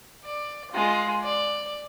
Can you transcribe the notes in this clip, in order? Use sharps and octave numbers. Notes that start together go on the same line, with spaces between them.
D5
G#3 F4
D5